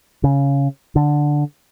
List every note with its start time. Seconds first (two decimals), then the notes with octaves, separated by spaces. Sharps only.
0.24 C#3
0.96 D3